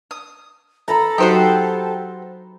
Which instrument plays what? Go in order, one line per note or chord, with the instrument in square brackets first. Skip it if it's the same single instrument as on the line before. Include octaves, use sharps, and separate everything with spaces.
[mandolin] D#6
[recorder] A4 [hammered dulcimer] A#5 B5
[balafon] F#3 D#4 F#4 [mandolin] G4 C5 F#5